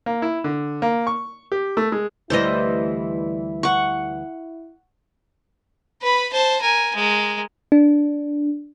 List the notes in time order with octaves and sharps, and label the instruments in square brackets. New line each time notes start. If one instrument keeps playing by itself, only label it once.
[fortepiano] A#3
E4
D3
A#3
C#6
G4
A3
G#3
[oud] D2 E3 G3 [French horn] E4 [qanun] C5 D#5
[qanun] F#5 C#6
[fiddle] B4 B5
C5 A5
A#4 G#5
G#3 A#4
[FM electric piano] D4